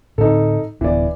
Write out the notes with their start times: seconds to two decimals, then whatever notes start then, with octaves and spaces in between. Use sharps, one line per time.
0.18 A2 D3 C4 D#4 A4
0.81 D1 E3 B3 D4 D5